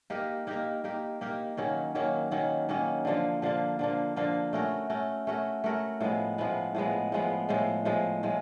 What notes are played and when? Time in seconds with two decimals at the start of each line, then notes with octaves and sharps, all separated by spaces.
0.10 A#3 D#4 G4 A#4
0.47 A#3 D#4 G4 A#4
0.84 A#3 D#4 G4 A#4
1.21 A#3 D#4 G4 A#4
1.57 D#3 F#3 A#3 C#4
1.95 D#3 F#3 A#3 C#4
2.31 D#3 F#3 A#3 C#4
2.69 D#3 F#3 A#3 C#4
3.05 D3 F3 A#3
3.42 D3 F3 A#3
3.79 D3 F3 A#3
4.16 D3 F3 A#3
4.53 A3 C#4 F#4 A#4
4.90 A3 C#4 F#4 A#4
5.27 A3 C#4 F#4 A#4
5.64 A3 C#4 F#4 A#4
6.01 A2 F3 G#3 B3
6.38 A2 F3 G#3 B3
6.75 A2 F3 G#3 B3
7.12 A2 F3 G#3 B3
7.49 A2 F3 G#3
7.85 A2 F3 G#3
8.23 A2 F3 G#3